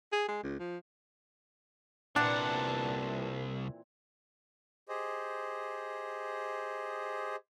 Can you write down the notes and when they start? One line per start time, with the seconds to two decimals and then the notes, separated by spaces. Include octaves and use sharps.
0.13 G#4
0.28 G#3
0.43 C#2
0.60 F3
2.16 C2 A#2 E3 C4 D4 B4 F#5 A5
4.89 G4 G#4 C5 D#5